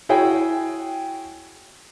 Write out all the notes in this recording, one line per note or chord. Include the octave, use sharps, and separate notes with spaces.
E4 F#4 G#4 C#5 G5